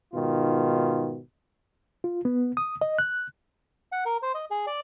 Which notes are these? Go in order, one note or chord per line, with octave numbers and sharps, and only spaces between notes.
G#2 B2 D#3 F4
F4
B3
D#6
D#5
F#6
F#5
A#4
C5
D#5
G#4
D5